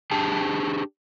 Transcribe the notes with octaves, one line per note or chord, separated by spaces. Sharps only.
D4 G4 G#4 A5